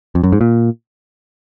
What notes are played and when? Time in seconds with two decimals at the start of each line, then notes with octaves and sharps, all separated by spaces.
0.15 F2
0.23 F#2
0.32 G#2
0.41 A#2